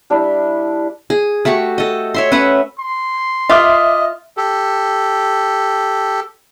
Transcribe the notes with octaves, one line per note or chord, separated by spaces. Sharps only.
G3 D4 E4 E5
G#4
A3 F#4 G4 C#6
A4 D#5
C#5 E5 C6
C#4 B4 E5 F#5
C6
F4 D#5 E5 D6 D#6
G4 A4